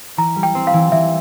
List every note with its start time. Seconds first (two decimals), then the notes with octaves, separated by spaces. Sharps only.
0.17 E3 A#5
0.36 G3
0.43 G5
0.55 C4
0.67 F5
0.73 E3
0.92 E3 E5